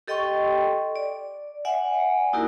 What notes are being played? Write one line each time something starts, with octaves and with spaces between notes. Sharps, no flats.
G4 A4 D#5 G5 C6 C#6
D5
D5 E5 F#5 G#5
A#3 D#4 E4 F#4 G4 A#4